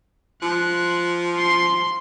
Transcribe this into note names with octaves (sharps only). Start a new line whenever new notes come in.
F3 F#6
C6 C7